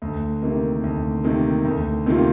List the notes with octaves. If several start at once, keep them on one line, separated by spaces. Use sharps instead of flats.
D2
C3 D#3 A#3
D2
C3 D#3 A#3
D2
C3 D#3 A#3 F4